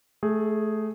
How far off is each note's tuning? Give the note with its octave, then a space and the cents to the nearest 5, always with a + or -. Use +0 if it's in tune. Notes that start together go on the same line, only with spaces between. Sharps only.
A3 -20 G#4 +0